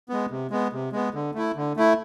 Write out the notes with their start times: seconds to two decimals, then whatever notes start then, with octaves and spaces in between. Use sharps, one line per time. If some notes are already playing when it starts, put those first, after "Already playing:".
0.09 G#3 B3
0.30 C3
0.51 G#3 B3
0.73 C3
0.92 G#3 B3
1.14 D3
1.35 A3 E4
1.56 D3
1.77 A3 E4